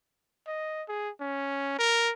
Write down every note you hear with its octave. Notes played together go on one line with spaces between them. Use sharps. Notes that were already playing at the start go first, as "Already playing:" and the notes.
D#5
G#4
C#4
A#4